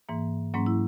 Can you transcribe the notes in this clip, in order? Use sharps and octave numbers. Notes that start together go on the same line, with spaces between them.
G#2 E3 A#3
G#2 F#3 A#3 C#4
E4